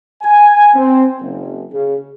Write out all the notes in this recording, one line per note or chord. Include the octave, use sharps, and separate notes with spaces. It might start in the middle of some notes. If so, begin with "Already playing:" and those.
G#5
C4
F#1
C#3